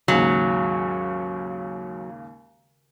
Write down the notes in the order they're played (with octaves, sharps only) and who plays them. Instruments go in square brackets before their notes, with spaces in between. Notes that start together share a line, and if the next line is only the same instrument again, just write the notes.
[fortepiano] D#2 G#2 C#3 [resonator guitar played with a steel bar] F#3